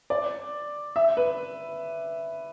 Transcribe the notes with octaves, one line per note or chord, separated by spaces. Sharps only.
D5
E5
B4